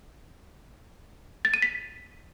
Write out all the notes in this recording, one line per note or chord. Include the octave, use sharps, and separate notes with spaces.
A6
D#7
B6